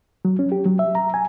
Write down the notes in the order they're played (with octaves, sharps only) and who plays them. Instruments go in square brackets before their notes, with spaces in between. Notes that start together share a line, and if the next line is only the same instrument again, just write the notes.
[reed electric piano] F#3
C#4
G4
F#3
E5
A#5
G#5